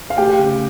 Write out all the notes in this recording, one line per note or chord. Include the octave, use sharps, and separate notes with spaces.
F5
A3 G4 G5
C#3